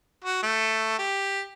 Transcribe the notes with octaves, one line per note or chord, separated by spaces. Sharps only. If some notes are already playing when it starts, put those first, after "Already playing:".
F#4
A3
G4